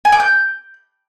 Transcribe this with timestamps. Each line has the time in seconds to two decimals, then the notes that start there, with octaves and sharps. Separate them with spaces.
0.05 G#5
0.12 D6
0.20 G6